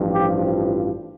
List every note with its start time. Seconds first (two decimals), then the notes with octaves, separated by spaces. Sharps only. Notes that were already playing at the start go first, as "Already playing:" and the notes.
Already playing: A1 G2 F3
0.14 G4